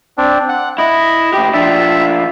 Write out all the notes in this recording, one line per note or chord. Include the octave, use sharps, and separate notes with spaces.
C4 D4
F#5
E4 D#5
A2 G4
F3 D4 E5